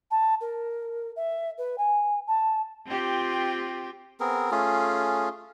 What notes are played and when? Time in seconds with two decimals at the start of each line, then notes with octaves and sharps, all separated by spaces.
0.11 A5
0.41 A#4
1.16 E5
1.58 B4
1.78 G#5
2.27 A5
2.87 C4 F4 G4
4.20 B3 C4 G#4 A#4
4.51 A3 C#4 F4 G#4